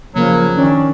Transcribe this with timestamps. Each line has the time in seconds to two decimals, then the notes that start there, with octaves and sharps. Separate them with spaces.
0.15 C#3 F3 F#3 A#3
0.56 D#3 C#4 D4